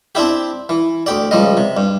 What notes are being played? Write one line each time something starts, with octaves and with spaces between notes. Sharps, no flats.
C4 D4 E4 G4
E3
D2 G4 D5
C#2 F3 G3 D#5
C3
G2